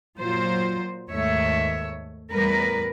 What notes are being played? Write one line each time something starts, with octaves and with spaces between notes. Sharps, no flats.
A#2 F#3 F4 C5
D#2 G#2 A3 C#5 E5
E2 A2 G3 A#4 B4